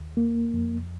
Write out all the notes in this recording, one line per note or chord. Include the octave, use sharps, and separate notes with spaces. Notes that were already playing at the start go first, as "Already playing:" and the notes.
Already playing: D#2
A#3
F2